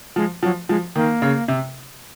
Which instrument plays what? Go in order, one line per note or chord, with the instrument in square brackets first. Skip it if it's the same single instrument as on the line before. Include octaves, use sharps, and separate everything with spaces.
[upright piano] F3 [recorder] G#3
[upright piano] F3 [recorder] F#3
[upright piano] F3 [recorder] G#3
[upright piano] D#3 [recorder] A#3
[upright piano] C#3
C3